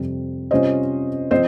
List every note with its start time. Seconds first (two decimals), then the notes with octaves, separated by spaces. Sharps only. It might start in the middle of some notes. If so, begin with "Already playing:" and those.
Already playing: F2 C3 G3 C4
0.51 C3 G3 C#4 F4 C5 D#5
1.31 F3 C4 C5 D#5